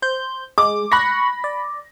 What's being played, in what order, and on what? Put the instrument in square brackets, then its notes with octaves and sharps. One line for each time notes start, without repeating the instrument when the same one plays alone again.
[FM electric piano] C5 G6
[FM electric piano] G#3 [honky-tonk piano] D6
[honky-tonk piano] B5 A#6 [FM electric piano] C#6 F#6
[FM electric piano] D5